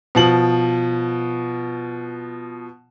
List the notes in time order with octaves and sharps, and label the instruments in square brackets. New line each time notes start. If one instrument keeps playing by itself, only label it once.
[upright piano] B2 F3 F#7